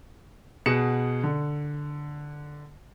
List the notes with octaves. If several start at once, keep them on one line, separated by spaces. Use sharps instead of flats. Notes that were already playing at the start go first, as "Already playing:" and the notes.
B2 G#4 F#6 C#7 E7
D3